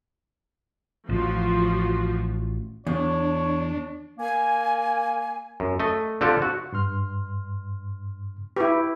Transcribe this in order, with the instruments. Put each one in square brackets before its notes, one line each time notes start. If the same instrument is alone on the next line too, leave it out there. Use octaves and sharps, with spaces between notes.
[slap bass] A1 [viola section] F3 F4 F#4
[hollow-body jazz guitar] E2 [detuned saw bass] D4 [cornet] C#5
[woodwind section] A#3 G#5
[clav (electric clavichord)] F#2
A3 D#5
D3 C4 F4 G4 A4
F#4
[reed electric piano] G2 C6 F6
[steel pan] E4 G4 [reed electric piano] B4 C#6